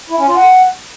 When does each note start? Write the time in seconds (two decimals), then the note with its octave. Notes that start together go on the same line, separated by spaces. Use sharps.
0.10 E4
0.19 C#4
0.28 F4
0.36 F#5